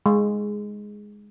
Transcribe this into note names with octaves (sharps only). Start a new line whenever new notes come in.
G#3